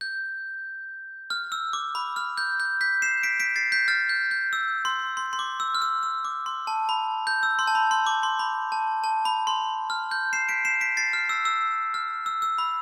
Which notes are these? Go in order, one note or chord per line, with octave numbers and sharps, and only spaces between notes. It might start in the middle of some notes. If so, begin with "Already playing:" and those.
G6
F6
E6
D6
B5
F6
G6
G6
G6 B6
C7 E7
B6 D7
B6 D7
A6 C7
G6 B6
F6 A6
G6
G6
E6
C6
C6
C6
D6
E6
F6
E6
E6
D6
C6
A5
B5
G6
E6
C6
A5
B5
C6
D6
C6
B5
A5
A5
B5
C6
F6
G6
C7 E7
B6 D7
C7 E7
B6 D7
A6 C7
F6
E6
E6
F6
E6
E6
B5